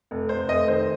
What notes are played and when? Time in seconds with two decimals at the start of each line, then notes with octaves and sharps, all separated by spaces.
0.11 F1
0.29 F1 C5
0.49 F1 D#5
0.68 D#3 C5